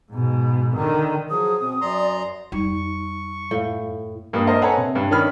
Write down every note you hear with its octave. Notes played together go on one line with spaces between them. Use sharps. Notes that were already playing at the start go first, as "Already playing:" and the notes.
G#2 B2
D3 D#3
F3 F#3 G#4 D#6
B2 C4
F#2 D5 A#5 C6
F2 G3 D#4 C#6
F#2 A2 F5
G2 A#3 D#6
A#4 C5 D#5
A4 B4 C#5 F#5 G#5 A#5
C3
G2
D#3 C#4 D4 B5 F6